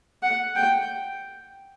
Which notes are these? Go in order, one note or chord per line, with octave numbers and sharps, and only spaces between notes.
F#5
G5